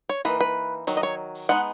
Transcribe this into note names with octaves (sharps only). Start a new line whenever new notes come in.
C#5
E3 A#3 D#4 B4
B4
D#3 F#3
D#5
C#5
G#3 B3 D#4 F#5